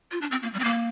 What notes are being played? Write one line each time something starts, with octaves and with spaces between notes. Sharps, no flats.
F4
D4
C4
A#3
G3
C4
A#3